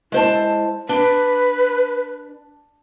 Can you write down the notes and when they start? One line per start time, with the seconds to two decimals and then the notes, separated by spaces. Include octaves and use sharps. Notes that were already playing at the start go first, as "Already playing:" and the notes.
0.12 G#3 E4 C5 A5
0.89 D4 B4